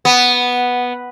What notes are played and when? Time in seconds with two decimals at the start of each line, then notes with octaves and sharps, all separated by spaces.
0.05 B3